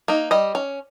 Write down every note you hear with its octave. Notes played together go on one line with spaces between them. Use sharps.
A#3 D#4
G3 D#5
C#4